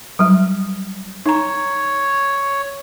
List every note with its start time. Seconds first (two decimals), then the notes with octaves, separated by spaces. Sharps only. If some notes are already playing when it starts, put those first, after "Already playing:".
0.19 F#3 G3
1.26 D#4 C#5 A#5